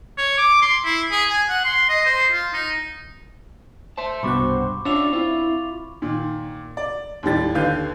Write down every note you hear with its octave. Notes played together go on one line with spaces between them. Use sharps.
C#5
D6
C6
E4
G#4
G#5
F#5
C6
D#5
C5
F4
D#4
C5 E5 A5
C2 G2 B2 F#5 B5 C#6 D6
C#4 D4 F4 F#4 E5 D6 F7
C4 E4 F4
A#2 D#3
D5
D#2 A2 G3 A6
D#2 D3 B4 F5 G6